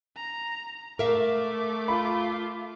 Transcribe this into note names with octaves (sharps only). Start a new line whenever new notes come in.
A#5
A3 A#4 E5 F5 D6
F4 B5